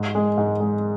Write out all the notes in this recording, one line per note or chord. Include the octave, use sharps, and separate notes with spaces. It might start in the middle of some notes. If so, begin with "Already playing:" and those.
Already playing: G#2
G#3
G#2
G#3